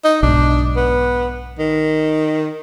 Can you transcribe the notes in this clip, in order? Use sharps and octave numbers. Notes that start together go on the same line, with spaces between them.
D#4
B1 G#2 D4
B3
D#3